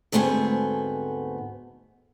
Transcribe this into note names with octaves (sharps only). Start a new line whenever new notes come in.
D2 G#2 A3 B3 C4 G#5